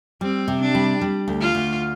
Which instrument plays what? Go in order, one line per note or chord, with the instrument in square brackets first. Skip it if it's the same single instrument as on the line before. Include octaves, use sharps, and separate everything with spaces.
[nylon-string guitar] G3 [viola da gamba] C4
[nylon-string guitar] C3
[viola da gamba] D4
[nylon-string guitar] G3
G3
D2
[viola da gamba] F4
[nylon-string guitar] D2